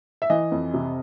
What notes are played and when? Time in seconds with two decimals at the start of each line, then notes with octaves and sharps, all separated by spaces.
0.22 E5
0.30 E3 D#5
0.52 F2
0.74 C3